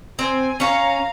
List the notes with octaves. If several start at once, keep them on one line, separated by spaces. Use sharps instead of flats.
C4 G#5
C#4 C#5 F5 A#5